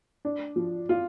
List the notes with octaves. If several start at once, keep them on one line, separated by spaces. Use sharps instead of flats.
D4
F3
F4